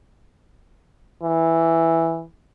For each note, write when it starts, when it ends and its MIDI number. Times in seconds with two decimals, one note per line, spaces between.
1.23 2.24 52